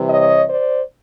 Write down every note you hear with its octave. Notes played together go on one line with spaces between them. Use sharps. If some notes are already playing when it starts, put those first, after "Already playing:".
Already playing: C3 E3 G3
C#5 D#5
C5 D5